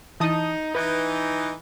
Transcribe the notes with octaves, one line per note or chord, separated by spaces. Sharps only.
E3 D#4 A5 D#6
E3 D#4 B4